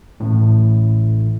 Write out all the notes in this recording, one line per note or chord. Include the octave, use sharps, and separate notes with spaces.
A1 A2